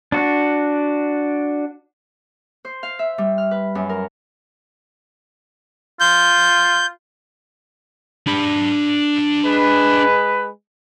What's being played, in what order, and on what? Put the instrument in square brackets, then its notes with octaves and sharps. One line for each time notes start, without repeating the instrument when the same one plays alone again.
[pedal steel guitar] D4 F#4
[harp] C5
F5
E5
G3
F6
B4
F#2
A#4
[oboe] F4 [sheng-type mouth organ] G6
[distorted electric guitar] D4 B5
[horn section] G#3 B4